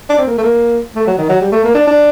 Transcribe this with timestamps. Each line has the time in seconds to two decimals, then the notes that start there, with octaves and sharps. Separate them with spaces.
0.10 D4
0.18 C4
0.27 A#3
0.38 A3
0.43 A#3
0.96 A3
1.07 F#3
1.18 D#3
1.29 F#3
1.41 G3
1.52 A3
1.64 A#3
1.75 D4
1.87 D4